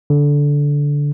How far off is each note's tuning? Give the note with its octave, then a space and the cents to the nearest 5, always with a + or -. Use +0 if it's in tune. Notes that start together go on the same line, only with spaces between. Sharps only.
D3 -15